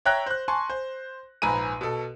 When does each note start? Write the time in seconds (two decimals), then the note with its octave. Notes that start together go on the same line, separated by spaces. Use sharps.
0.05 C#5 E5 G5 A#5 F#6 A#6
0.26 C5 F#6
0.48 G#5 A5 C6 C#6
0.70 C5
1.42 A#1 G#2 B4 G#5 A#5 D#7
1.81 B2 A4